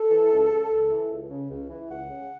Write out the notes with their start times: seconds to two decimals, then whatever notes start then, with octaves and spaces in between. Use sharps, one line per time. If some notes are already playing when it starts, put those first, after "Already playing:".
Already playing: A4
0.10 E3
0.31 C#2
0.50 C#3
0.71 C#2
0.91 E3
1.10 C#2
1.30 C#3
1.50 C#2
1.70 E3
1.89 C#2 F#5
2.10 C#3